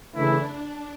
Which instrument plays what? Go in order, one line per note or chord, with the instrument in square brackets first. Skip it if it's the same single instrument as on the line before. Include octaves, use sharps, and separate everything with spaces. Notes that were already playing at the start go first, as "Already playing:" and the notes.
[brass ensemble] C#3 E3 A3 E4 [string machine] D4